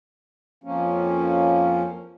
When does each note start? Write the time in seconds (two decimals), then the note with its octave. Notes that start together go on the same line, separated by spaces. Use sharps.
0.64 F2 F3 A#3 C#4